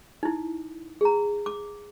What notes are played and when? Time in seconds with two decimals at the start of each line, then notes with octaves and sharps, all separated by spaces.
0.23 D#4 E4
1.01 G#4 A#5
1.46 D6